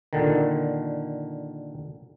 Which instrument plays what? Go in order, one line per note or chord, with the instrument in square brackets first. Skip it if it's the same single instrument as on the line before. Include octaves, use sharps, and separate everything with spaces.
[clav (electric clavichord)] A#2 D3 D#3